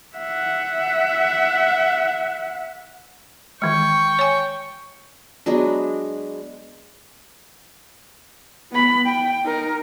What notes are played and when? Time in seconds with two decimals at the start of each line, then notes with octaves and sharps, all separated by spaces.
0.17 E5 F#5
3.62 D#3 E3 G#3 G5 C#6
4.19 C#5 G#5
5.46 F#3 G#3 B3 D4
8.71 B3 B5
9.06 G5
9.43 D#4 A#4